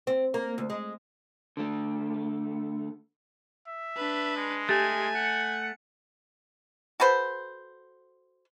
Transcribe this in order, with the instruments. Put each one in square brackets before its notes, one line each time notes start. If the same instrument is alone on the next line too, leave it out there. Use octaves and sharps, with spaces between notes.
[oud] C4
A#3
D2
G#3
[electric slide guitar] D3 A3
[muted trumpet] E5
[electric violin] D4 B4
[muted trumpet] G#3
[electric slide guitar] A3 [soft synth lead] G4 [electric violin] G#5
[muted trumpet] F#5 [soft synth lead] C#7
[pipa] F#4 A4 B4 C5